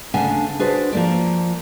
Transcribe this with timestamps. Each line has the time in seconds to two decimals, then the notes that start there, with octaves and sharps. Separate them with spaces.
0.14 D2 C#3 D4 F#5 G#5
0.59 D4 F#4 G#4 B4 C5
0.93 F3 A#3 D5